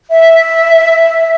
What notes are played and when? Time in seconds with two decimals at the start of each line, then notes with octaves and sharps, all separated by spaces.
0.11 E5